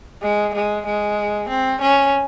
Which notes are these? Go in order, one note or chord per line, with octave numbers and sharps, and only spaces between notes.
G#3
G#3
G#3
C4
C#4